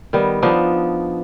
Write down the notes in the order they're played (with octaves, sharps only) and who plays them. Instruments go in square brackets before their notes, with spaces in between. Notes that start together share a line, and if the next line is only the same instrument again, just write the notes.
[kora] D#3 G3 B3
F3 B3 D4 D#4